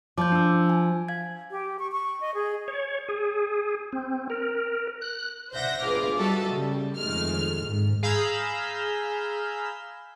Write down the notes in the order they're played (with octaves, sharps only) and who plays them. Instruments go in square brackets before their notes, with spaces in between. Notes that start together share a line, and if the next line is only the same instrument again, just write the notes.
[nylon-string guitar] F3 [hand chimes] D6 G6
[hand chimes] D4 E6
G#5
F5 G#6
[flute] G4
C#6
C#6
D#5
G#4
[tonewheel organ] C#5
G#4
C4
A#4
F#6
[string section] C5 D5 E5 F#5 G6 A#6
G1 F4 G#4 B4 D6 F6
G3 F#4 A4 D#5 E5
C#3 G3
F2 D#3 G#3 A3 F6
G#2
[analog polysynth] G#4 F5 A#5 B5 E6 G6